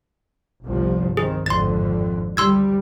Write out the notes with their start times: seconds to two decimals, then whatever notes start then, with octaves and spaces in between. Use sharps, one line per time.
0.64 G1 C2 F3
1.17 D#3 C4 G#4
1.46 G#1 F2 D3 C6 A6
2.37 D2 G3 C6 E6 G#6